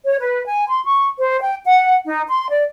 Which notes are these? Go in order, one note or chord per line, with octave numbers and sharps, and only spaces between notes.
C#5
B4
G#5
C6
C#6
C5
G5
F#5
D#4
C6
D5